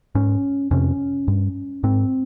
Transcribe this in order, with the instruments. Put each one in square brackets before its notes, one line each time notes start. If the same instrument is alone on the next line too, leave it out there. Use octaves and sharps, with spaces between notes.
[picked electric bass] G#2 C#4
F2 C3 C#4
G2
G#2 C4